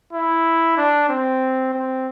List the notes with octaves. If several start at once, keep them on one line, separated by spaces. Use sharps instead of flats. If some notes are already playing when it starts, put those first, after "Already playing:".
E4
D4
C4
C4